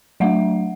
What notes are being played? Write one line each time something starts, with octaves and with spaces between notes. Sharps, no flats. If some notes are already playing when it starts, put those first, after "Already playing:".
F#3 A3 D4 E5 F#5